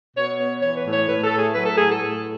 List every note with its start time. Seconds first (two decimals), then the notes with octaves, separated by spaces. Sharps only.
0.16 B2 C#5
0.39 B3 C#5
0.62 E3 C#5
0.77 B4
0.86 A2
0.93 C#5
1.08 A2 B4
1.24 A4
1.31 A3
1.39 G#4
1.54 F#3 B4
1.66 A4
1.78 A2 G#4
1.90 A4
2.01 A2